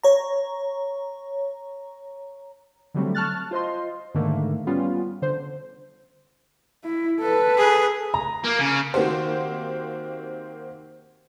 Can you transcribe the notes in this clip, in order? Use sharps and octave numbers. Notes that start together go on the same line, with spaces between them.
C#5 A#5
D3 F#3 G3 A3 C4
A5 C#6 F6 F#6 A6
F4 C5 D#5 C6
G#2 D3 D#3 A3 A#3
G3 B3 C#4 F4
D3 C5
E4
A4 B4
G#4
A#5
A#3
C#3
D#3 A#3 C4 F#4 G4 C5